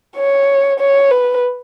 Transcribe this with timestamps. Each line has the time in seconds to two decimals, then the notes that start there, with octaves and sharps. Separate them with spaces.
0.16 C#5
0.79 C#5
1.11 B4